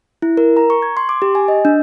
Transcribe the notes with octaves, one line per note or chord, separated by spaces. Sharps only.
E4
A#4
A#5
C#6
G#6
C6
D6
G4
G#5
D#5
D4